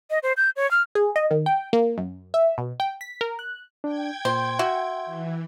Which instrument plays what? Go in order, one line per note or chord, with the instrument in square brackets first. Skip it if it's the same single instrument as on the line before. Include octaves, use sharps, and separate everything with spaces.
[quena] D#5
C5
G6
C#5
F6
[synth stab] G#4
D#5
D#3
G5
A#3
F#2
E5
B2
G5
B6
A#4
F#6
[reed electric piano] D4 [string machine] G5 G#6
[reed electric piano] A#2 [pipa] C5 [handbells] C6
[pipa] F#4 [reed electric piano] E5
[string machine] E3